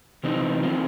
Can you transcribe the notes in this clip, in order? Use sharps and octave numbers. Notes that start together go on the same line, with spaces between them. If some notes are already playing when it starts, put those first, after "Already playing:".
C3 E3 C4 D#4
E3 G3 C4 F4